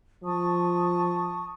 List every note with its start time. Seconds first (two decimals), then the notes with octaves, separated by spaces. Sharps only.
0.24 F3 A5 C#6 D#6